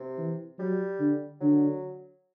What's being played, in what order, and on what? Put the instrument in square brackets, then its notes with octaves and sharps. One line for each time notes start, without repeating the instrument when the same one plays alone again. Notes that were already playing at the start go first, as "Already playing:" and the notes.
Already playing: [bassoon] C3
[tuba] E3
[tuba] F#3 [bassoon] G3
[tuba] D3
[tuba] D3 [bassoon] F#3